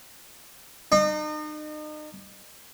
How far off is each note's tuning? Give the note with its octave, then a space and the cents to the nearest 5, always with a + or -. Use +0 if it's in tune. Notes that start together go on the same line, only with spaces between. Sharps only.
D#4 -35